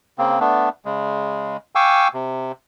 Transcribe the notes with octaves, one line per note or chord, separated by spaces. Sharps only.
C#3 A#3 C4
A3 B3 D4
C#3 G#3
F5 G5 G#5 C#6 D6 E6
C3